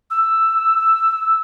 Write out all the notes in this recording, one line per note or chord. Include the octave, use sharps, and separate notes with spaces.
E6